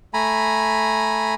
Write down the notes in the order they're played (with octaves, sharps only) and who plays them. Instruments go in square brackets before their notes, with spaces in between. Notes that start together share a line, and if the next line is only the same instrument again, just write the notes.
[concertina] A3 G#5 A#5 B5